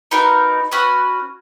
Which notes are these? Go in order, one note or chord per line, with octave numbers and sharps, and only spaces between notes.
B3 D#4 F#4 A#4
C#4 F#4 B4